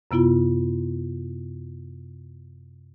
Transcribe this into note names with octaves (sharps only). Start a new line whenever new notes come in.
F#2 C3 B3 E4 F4